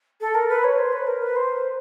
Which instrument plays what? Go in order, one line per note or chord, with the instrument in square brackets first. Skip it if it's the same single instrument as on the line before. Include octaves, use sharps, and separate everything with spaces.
[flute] A4
A#4
B4
C#5
C5
B4
A#4
B4
C5